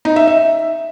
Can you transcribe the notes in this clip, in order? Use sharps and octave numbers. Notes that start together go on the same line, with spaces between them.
D#4
E5
E5